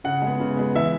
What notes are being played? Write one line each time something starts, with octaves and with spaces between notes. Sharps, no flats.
C#3 F#5
G#3
B3
C#3
G#3 B3
E3 E5